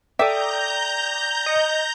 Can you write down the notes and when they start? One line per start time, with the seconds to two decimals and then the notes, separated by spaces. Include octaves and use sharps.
0.19 A4 D5 E5 G5 A#5 D6 D#6 G6
1.46 D#5 C#7